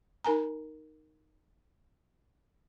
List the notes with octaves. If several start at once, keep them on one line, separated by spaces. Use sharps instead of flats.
D#4 A#4 G#5 A#5